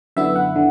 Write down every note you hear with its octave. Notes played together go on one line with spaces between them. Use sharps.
F#2 D3 B3 E4 E5
F#5
D3